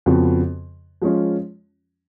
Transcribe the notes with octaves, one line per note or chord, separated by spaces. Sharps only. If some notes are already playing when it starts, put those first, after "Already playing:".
F2 C#3 F3 B3 F#4
F3 G#3 C#4 F4